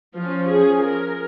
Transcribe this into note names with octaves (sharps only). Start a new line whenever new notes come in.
F3 C#4 F4
G#4
A#4